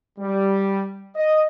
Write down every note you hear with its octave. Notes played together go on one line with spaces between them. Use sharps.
G3
D#5